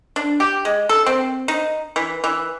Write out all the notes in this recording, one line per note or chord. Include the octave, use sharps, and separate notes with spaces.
D4
G4
G#3
A4
C4
D#4
E3
E3